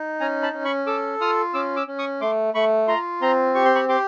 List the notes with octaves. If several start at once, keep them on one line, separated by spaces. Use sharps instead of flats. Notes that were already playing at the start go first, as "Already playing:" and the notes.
Already playing: D#4
C#4 G#5 A#5
A5 B5
C#4
B5 C#6
A4 D6 E6
F4 D#6 F6
C#4 D6 E6
D6 E6
C#4
C#6 D#6
A3 C6 D6
A3 B5 C#6
F4 A#5 C6
C4 A#5 C6
G4 C#6
C6
B5 C#6
G4 C6 D6